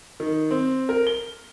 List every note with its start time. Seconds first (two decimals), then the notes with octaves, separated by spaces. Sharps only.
0.20 D#3
0.51 C4
0.89 A#4
1.07 G7